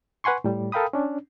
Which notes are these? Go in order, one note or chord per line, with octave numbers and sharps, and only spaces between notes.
B4 F#5 G#5 C6 C#6
A2 G3
A4 A#4 F5 G5 B5 D#6
C#4 D4